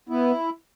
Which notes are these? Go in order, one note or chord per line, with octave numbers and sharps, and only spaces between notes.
B3 E4